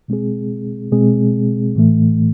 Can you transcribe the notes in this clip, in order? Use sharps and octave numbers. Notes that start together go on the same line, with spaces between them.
B2 G#3 C4 G#4
B2 G#3 C4 G#4
A2 E3 A3